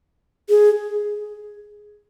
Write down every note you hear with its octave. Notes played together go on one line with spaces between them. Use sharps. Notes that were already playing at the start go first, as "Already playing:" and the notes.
G#4